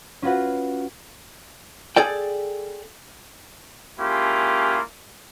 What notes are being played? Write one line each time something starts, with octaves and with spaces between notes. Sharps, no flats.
C#4 F4 F#4 B4 F#5
G#4 A4 D5 G5
G#3 A#3 C#4 E4 F4 G4